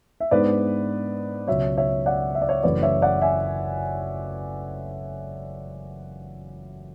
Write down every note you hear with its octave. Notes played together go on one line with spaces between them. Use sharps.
E5
G#2 G#3 B3 D4 B4 D5
C#2 B2 F#3 C#5 E5
C#5 E5
D5 F#5
E5
D5
C#5 E5
F#1 F#2 E3 A3 B4 D5
C#5 E5
D5 F#5
E5 G#5